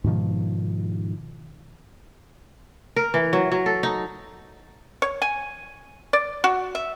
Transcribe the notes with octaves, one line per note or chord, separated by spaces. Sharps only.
G#2 B2 D#3 F3
A#4
E3
F#3
F#3
A4
D#4
C#5
G#5
D5
F#4
E5